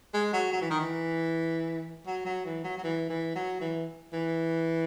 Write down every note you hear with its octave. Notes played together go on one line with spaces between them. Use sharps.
G#3
F#3
F#3
E3
D#3
E3
F#3
F#3
E3
F#3
F#3
E3
E3
F#3
E3
E3